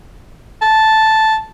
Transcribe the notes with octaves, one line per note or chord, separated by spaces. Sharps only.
A5